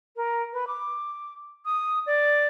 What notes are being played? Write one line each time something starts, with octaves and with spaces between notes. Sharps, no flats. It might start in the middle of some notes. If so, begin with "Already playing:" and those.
A#4
B4
D6
D#6
D5